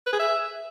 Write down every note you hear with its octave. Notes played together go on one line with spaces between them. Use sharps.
B4
G#4
E5